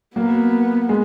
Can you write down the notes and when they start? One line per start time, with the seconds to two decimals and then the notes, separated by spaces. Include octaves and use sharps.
0.16 F#3 A#3 B3
0.89 G#3